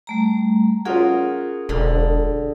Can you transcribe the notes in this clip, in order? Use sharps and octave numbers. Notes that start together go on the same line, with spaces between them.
G3 A3 A#5
C#4 F4 F#4 G#4 A#4 D#6
E1 D3